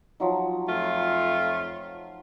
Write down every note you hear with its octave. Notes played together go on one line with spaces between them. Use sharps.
F3 F#3 D#4
F2 A3 F4